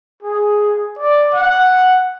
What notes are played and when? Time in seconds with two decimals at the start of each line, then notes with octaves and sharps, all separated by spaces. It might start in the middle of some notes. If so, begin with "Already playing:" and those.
0.23 G#4
0.99 D5
1.34 F#5